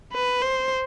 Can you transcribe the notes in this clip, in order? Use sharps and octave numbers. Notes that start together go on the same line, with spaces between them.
B4
C5